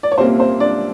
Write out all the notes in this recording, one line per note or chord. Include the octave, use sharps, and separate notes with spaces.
D5
C#5
C2 A#2 G3 A#3 C4 C#4 C5
C4 C5
D4 D5